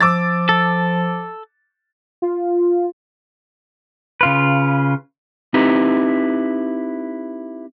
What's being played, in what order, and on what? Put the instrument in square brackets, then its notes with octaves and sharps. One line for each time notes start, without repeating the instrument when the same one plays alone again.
[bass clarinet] F3 [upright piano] D6 E6 A6
[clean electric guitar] A4
[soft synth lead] F4
[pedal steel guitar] C#3 F4 B4
[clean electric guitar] C4 D#4 E4 G4 B4